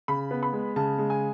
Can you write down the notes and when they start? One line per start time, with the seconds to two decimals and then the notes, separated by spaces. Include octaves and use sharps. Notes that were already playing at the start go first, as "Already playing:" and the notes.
0.08 C#3 B5
0.31 B3
0.43 B5
0.53 G#3
0.76 C#3 A5
0.98 G#3
1.10 G#5